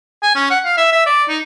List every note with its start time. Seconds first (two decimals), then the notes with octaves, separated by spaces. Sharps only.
0.23 G#5
0.35 C#4
0.50 F#5
0.65 F5
0.77 E5
0.92 E5
1.06 D5
1.28 D#4